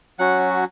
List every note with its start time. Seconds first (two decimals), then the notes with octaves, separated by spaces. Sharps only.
0.19 F#3 C#4 F#4 F#5